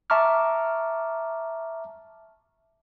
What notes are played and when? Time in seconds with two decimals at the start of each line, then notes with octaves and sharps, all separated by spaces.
0.10 E5 A5 A#5 C#6 D6 F6